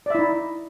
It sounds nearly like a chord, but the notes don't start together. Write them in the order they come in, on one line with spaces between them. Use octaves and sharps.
D5 E5 E4 D#4